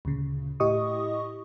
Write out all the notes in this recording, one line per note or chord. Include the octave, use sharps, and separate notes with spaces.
D2 A#2 C#3
A2 E4 G4 D#5 C#6 D#6